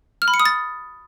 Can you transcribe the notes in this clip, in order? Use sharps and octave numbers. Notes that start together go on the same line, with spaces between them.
F6
B5
C#7
D#6
A6